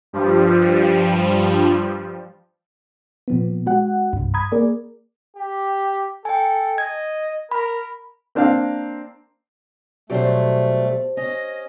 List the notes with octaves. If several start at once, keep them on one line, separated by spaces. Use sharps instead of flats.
G2 F3 G3
A#2 F3 B3
G#3 F#4 F#5
C2 G2
A#5 B5 D#6 G#6
A#3 G#4 A#4 D5
G4
A4 G5 G#5
D#5 G#6
A#4 B5
A#3 C4 D4 A#4 F5
B2 F#3 G3 A3 C#4 G4 C5
C#4 D#5 A#6